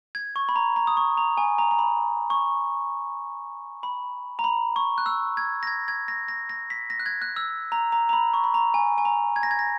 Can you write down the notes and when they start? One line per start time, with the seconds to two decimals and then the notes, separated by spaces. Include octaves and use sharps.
0.15 G#6
0.36 C#6
0.49 B5
0.56 A#5
0.76 A#5
0.87 D#6
0.97 C#6
1.18 A#5
1.37 G#5
1.58 A#5
1.71 A#5
1.79 B5
2.30 C#6
3.83 B5
4.39 A#5
4.44 B5
4.76 C#6
4.98 F#6
5.06 E6
5.37 G#6
5.63 A#6
5.67 G#6
5.88 G#6
6.08 A#6
6.28 A#6
6.49 A#6
6.70 B6
6.90 A#6
7.00 F#6
7.06 G#6
7.22 F#6
7.36 E6
7.72 A#5
7.92 A#5
8.09 A#5
8.13 B5
8.34 C#6
8.44 B5
8.54 A#5
8.74 G#5
8.98 G#5
9.05 A#5
9.36 G#6
9.43 A#6
9.51 G#6
9.59 A#6